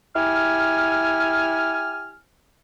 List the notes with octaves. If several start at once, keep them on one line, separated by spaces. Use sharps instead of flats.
E4 G4 G#5 F6